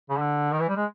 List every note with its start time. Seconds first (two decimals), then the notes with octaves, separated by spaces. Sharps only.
0.10 C#3
0.19 D3
0.52 D#3
0.61 E3
0.68 G3
0.76 G#3